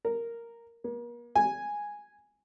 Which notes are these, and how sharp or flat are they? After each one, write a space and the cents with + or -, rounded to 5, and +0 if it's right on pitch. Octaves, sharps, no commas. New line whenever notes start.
A#4 -5
A#3 +40
G#5 -5